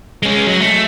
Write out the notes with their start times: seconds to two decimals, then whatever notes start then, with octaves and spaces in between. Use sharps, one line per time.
0.23 G#3 C#4
0.46 F#3
0.61 A3